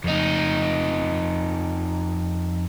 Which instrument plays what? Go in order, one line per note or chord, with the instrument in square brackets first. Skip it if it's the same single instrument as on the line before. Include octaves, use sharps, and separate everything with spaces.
[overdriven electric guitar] F2 D#4